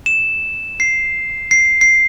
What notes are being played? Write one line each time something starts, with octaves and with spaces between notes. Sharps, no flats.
E7
C7
C7
C7